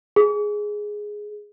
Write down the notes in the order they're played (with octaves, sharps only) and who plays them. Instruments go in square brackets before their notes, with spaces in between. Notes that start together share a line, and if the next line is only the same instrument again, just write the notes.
[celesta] G#4